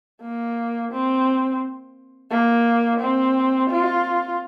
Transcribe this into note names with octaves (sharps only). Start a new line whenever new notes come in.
A#3
C4
A#3
C4
F4